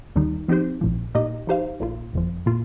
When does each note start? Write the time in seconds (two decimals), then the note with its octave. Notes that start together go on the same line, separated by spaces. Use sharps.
0.16 D#2 D#3 G3 D#4
0.48 F3 C4 D#4 G4 C5
0.81 A#1 A#2 F3
1.15 A#2 A#3 D#4 G4 D#5
1.47 F3 D#4 G4 C5 F5
1.80 A#1 A#2 A#3 F4
2.13 G1 F2 F3
2.46 A#2 A#3 F4